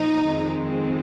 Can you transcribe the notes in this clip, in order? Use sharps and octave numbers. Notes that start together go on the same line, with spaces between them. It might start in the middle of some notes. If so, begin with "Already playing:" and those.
Already playing: A#2 F3 D#4
F2 D#3 G#3 C4